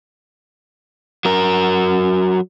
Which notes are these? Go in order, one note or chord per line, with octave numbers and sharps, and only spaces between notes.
F#3 A#4